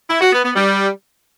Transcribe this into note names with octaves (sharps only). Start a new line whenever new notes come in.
E4
F#4
B3
B3
G3